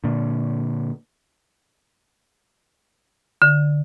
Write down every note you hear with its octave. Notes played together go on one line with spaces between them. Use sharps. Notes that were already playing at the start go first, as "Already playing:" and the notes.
A#2 D3
D3